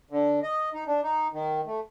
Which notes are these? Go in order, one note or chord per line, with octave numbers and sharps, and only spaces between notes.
D3
D#5
D#4
D4
D#4
D#3
A3